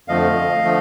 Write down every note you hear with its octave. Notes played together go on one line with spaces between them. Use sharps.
F2 D3 F3 A3 D#5 F5
D3 F3 A3